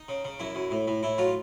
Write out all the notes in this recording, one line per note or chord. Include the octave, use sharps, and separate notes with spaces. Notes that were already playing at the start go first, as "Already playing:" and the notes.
Already playing: D#4
C#3
C#3
F#2 E4
F#2
A2
A2
A2 E4
F#3 F4